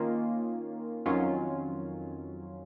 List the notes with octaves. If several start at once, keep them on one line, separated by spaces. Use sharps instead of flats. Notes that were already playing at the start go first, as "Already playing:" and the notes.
Already playing: D#3 A#3 C#4 F4
F2 D#3 F#3 C#4 F4